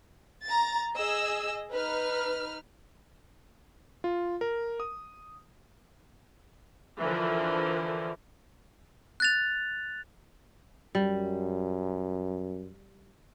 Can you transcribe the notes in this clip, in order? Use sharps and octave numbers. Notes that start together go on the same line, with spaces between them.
A#5 A6
G#4 D#5 E6
D#4 B4 F6
F4
A#4
D#6
D3 E3 F3 A#4
F#6 A6 F7
F#2 G3